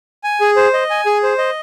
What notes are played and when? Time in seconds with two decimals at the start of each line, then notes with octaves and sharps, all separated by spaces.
0.24 G#5
0.41 G#4
0.56 C5
0.74 D#5
0.90 G#5
1.06 G#4
1.23 C5
1.38 D#5